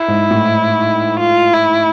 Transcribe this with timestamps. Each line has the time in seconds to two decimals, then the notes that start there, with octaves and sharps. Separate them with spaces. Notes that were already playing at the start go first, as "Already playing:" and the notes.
Already playing: E4
0.08 G#2
0.31 A2
1.20 F4
1.53 E4